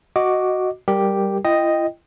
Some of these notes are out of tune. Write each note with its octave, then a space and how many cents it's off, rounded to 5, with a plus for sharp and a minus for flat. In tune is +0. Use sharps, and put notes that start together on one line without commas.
F#4 +0 D#5 +0 D6 +0
G3 +0 G4 +0 A#4 +0
E4 +45 D#5 +0 G5 +0